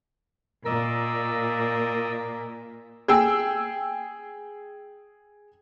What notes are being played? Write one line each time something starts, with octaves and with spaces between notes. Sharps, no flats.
A#2 A#4 D5 D#5 E6
G#4 G5 E6